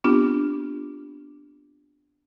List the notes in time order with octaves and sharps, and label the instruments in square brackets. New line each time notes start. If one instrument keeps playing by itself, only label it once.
[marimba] B3 C4 D4 F4 G4